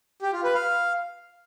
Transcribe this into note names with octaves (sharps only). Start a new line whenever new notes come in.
G4
F4
B4
F5